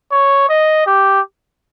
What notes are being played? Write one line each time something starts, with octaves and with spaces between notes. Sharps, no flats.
C#5
D#5
G4